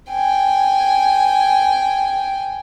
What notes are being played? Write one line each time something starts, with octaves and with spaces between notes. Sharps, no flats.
G5 G#5